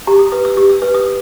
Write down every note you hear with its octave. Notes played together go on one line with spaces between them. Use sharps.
G4 A#5
D#6
B4 D#6
E6
G4 E6
E6
B4 E6
D#6